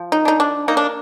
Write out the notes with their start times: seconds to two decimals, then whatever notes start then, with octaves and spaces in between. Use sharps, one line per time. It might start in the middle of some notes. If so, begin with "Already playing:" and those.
Already playing: F3
0.12 D#4
0.25 D4 D#4
0.40 D4
0.68 A#3 D#4
0.77 D4